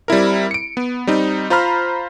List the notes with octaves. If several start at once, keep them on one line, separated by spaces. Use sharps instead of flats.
G3 C4 E4 A#4
C#7 D7
B3
G3 C4 D#4
F4 C5 A#5 B5 F6